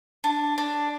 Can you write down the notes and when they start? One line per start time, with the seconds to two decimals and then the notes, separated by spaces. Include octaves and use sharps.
0.24 D4
0.58 D4